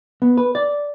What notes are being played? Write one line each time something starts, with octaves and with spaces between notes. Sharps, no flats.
B3
B4
D5